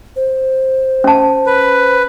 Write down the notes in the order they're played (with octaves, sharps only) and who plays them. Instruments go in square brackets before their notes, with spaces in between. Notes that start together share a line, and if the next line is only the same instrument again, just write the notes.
[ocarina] C5
[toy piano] C#4 A5
[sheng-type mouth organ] B4